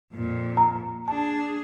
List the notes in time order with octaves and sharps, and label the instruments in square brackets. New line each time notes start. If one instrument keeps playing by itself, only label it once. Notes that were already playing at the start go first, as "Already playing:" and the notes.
[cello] F2 A#2
[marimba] A#5
[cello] D4 G#4 [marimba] A5